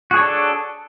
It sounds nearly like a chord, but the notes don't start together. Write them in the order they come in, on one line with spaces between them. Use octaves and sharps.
F#4 G#4 C#5 D4 A4